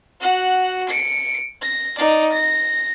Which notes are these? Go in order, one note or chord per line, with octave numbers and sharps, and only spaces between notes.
F#4 F#5
C#7 D7
A#6
D#4 D5
A#6